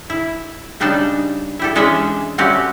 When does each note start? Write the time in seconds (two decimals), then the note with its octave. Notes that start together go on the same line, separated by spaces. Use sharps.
0.10 E4
0.80 C#3 G3 D4 D#4 G5 A5
1.59 E4 G4 A4
1.75 E3 G#3 C#4 D4 D#5 E5
2.38 G3 A3 C4 C#4 F#4 G4